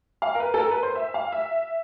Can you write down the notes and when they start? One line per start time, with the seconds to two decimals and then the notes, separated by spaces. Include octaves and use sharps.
0.22 F5
0.35 A#4
0.40 B4
0.54 A4
0.58 A#4
0.71 B4
0.83 C5
0.95 E5
1.14 F5
1.32 E5